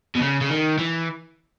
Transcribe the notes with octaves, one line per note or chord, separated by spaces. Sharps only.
B2
C#3
C#3
D#3
E3